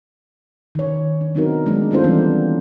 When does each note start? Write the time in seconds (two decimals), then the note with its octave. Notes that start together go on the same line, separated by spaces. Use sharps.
0.75 D#3 C#5
1.21 D4
1.35 F#3 B3 C4 D#4 F#4 A#4
1.66 F#3 G#3 A3 D4 D#4
1.91 C#4 D#4 F4 A4 C5
2.04 E3 G3 G#3 B3 C4 D4